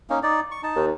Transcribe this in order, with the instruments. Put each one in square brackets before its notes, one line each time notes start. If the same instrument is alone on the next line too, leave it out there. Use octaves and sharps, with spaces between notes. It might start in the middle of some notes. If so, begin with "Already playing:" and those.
[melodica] A#3 C#4 D#4
D#4 D5
C#6
D#4 A5
[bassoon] D#2